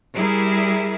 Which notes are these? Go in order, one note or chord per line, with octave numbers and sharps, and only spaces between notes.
G3 E4 G#4 A#4